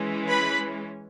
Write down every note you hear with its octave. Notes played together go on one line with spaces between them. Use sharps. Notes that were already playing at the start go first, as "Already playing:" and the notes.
Already playing: E3 G#3 C#4
B4 B5